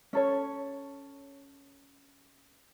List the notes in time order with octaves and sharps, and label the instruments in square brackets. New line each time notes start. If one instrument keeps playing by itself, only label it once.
[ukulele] C#4 A4 C#5